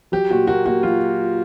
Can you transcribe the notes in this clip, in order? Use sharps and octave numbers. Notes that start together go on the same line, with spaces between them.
F#3 G4
A#2 F#4
A#3 F#4
A#3 F#4
F#3 F4